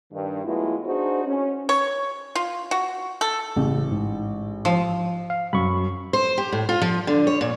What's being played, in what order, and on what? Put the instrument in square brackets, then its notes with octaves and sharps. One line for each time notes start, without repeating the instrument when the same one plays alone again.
[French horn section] G2 D#3
F#3 G#3 A3 B3 E4 F4
D4 D#4 F#4 G#4 C5
C#4
[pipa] C#5
F4
F#4
A4
[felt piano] A1 [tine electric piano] C#3
[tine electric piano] G#2
[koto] F3
[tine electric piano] F5
[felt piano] F#2 [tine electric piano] B5 C#6
[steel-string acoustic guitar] C5
G4
A2
F4
F3
D3
C#5
A#2